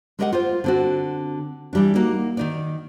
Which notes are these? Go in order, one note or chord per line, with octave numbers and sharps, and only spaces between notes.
G#3 G4 A#4 D#5 F5 F#5
F4 C5
D3 C4 F#4
E3 G3 D4
A#3 D#4 F#4
D#3 D#4 D5